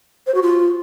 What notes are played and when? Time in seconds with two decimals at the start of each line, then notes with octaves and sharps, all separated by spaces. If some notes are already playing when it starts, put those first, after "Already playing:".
0.27 C5
0.34 F#4
0.42 F4